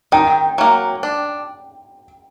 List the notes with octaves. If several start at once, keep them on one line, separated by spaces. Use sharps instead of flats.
D#3 G5
F#3 A#3
D4